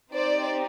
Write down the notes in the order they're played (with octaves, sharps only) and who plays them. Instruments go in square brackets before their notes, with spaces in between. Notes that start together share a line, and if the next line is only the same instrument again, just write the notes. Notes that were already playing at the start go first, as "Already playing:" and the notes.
[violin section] C4 D#4 G4 C5 D5